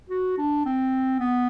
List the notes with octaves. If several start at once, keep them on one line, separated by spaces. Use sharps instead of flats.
F#4
D4
C4
B3